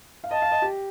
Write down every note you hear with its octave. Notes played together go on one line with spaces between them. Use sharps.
F5
D#5 A5
F5
D#5
G4